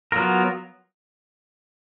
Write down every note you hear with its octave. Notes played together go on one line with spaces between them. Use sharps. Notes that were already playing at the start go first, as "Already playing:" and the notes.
F#3 B3 F4 A#4